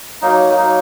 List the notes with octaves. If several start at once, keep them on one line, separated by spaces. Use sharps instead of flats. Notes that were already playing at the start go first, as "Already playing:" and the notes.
F#3 A#3 D#4
F#3 A#3 D#4